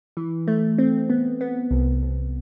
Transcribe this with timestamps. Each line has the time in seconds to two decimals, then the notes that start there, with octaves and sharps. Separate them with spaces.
0.17 E3
0.47 A3
0.78 C4
1.10 B3
1.41 B3
1.71 C2
2.02 C2